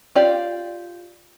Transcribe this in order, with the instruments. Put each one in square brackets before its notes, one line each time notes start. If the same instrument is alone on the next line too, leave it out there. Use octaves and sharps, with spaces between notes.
[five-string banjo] F4 G4 D5 F5